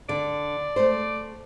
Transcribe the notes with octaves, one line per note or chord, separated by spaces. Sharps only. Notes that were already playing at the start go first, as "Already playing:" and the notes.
D3 D5
A3 C5